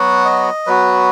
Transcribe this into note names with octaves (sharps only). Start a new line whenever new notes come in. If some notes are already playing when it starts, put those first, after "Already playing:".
Already playing: F#3 B3 F#4 F#5
D#5
F#3 B3 F#4 B4